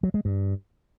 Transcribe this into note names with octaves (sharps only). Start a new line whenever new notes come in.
F#3
G#3
G2